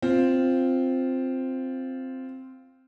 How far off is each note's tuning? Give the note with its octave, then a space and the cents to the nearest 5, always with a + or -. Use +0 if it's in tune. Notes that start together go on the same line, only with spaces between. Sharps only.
C4 +0 F4 +0